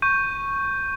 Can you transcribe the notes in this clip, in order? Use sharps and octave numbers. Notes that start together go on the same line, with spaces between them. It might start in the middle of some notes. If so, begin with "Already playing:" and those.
C#6 G6 D#7